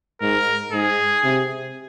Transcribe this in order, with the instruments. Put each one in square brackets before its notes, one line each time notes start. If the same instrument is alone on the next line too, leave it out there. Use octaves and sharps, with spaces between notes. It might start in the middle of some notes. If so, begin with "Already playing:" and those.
[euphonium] G#2 [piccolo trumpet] A#4
[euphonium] G#2 [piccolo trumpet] G#4
[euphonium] C3